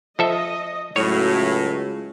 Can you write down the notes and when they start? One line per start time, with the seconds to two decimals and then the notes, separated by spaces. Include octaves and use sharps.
0.19 F3 A4 D#5 E5
0.96 C#2 A2 F#3 C#5